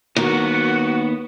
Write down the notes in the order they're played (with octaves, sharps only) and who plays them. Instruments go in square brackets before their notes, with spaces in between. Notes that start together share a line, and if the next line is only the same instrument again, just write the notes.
[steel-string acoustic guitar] D#2 [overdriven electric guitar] B3 A#4 [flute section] F#4